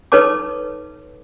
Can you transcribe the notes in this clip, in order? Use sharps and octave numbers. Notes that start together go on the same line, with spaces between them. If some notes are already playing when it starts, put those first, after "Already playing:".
D#4 A4 B4 C#5 A5 D6